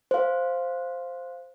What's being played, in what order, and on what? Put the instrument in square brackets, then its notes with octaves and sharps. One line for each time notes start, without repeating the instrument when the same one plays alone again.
[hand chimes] C5 F5